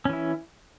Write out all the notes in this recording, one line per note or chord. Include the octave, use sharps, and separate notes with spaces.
E3 C#4 E4